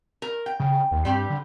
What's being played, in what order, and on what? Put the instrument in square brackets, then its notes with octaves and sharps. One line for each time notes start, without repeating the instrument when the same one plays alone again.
[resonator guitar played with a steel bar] A#4
G5
[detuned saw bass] C#3
D#2
[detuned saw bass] G2 [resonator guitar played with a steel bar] G3 C4 G4
[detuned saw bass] D3